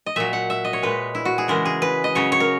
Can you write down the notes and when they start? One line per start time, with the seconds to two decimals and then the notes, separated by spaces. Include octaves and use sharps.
0.06 D#5
0.16 A#2 F#3 E5
0.33 F#5
0.50 E5
0.65 D#5
0.73 C#5
0.83 A#2 G#3 B4
1.15 E4
1.25 F#4
1.38 G#4
1.48 C#3 E3 G#3 A#4
1.65 G#4
1.82 B4
2.04 D#5
2.15 C#3 F#3 C#5
2.32 C#5
2.40 A#4